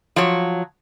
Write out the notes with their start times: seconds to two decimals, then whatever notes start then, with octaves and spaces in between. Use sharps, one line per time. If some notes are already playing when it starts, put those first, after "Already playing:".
0.16 F3 F#3 C#5